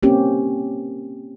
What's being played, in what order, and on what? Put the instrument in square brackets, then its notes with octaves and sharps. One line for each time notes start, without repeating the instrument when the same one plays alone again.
[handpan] A#3 C4 C#4 G4